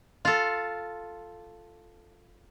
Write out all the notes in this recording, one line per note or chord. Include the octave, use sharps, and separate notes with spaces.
F4 A4